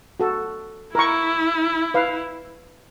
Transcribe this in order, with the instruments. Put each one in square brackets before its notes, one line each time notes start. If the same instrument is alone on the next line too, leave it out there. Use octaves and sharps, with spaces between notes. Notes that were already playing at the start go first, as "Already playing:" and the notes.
[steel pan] F#4 A4
[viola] E4 [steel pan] A#4 C#6
[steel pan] B4 F5